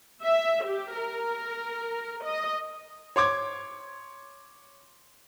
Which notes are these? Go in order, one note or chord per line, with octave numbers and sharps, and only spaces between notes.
E5
G4
A#4
D#5
C#5 C6 D6 G#6